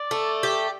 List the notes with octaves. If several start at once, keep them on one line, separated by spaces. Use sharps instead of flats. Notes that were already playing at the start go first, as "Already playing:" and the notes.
Already playing: D5
A3
G4